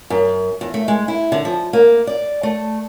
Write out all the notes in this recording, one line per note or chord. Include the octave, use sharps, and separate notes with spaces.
F#2
E2
A3
G#3
E4
D3
F3
A#3
D5
A3